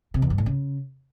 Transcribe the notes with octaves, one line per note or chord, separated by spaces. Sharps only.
C3
E2
G2
A2
C#3